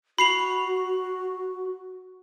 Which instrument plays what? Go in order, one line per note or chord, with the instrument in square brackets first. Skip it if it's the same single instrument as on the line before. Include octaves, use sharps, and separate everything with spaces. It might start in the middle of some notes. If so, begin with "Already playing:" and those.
[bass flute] F#4 [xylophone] B5 C7 F7